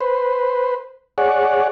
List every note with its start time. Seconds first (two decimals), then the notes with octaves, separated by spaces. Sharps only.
0.01 B4 C5
1.18 G#4 C#5 D5 F#5